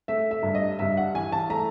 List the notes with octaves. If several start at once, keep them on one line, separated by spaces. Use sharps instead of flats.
A3 E5
E5
G2
D#5
G2 E5
F#5
E3 G#5
A5
A3 A#5